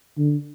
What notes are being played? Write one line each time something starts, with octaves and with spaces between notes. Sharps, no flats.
D3